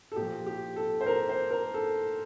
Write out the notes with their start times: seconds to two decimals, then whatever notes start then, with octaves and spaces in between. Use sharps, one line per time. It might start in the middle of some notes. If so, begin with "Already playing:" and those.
0.12 A4
0.16 A#2 F3 G4
0.46 G4
0.76 A4
1.01 C5
1.06 A#4
1.29 C5
1.51 A#4
1.74 A4